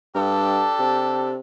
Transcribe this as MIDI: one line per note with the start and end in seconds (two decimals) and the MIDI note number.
0.15 0.67 43
0.15 1.33 62
0.15 1.33 67
0.15 1.33 69
0.79 1.40 48